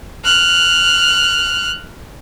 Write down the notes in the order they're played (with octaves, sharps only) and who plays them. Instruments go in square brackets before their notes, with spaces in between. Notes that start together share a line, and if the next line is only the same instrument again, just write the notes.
[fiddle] F6 F#6